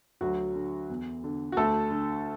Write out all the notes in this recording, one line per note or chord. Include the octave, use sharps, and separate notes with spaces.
D2 F#3 F#4
D3
E2
D3
F#4
D2 A3 A4
D3